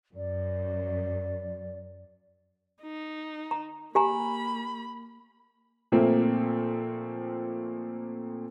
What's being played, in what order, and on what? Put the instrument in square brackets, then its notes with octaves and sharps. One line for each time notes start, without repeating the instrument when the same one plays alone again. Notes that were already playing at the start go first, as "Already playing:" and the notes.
[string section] F#2 [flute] D5
[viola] D#4
[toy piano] A#5
[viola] A#3 B5 [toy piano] G4 G#5 A#5
[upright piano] A#2 F3 A3 A#3 C4